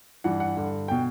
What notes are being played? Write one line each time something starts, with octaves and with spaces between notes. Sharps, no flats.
G2 E3 F#5
F#5
G2 D3
B2 G5